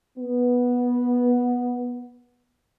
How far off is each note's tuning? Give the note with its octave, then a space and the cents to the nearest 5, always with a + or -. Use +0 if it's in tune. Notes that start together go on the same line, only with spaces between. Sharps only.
B3 -10